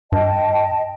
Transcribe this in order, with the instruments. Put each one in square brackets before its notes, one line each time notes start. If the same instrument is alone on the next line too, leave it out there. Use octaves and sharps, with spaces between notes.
[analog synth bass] G2 [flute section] D#5 G5 A5